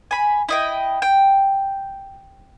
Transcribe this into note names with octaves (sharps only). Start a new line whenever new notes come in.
G#5 B5
E4 D#5 G5
G5